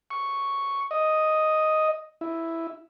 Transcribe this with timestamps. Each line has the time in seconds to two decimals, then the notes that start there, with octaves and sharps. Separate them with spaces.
0.11 C#6
0.91 D#5
2.21 E4